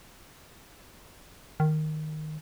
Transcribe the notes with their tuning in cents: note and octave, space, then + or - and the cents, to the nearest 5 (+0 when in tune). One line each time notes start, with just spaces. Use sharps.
D#3 -10